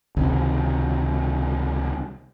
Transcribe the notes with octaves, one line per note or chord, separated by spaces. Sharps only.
C#2 C3 D#3